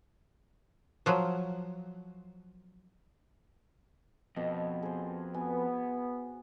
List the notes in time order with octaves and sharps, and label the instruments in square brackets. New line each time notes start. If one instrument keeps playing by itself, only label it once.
[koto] F3 F#3
[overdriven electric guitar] F2 [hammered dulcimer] B2
[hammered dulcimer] G#4 C5
[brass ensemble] B3 [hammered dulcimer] F#4 G#5